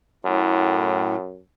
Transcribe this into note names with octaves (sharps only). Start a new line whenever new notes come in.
F#2 A2